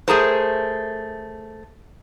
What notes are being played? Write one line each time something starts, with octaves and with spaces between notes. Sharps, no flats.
A3 G#4 A#4 C5